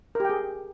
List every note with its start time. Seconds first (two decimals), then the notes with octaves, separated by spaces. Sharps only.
0.15 A#4
0.20 G4
0.25 G5
0.30 G#4